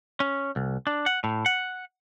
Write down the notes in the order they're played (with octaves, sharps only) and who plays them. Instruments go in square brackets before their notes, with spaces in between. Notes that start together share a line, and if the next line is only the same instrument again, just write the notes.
[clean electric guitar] C#4
C2
D4
F#5
A2
F#5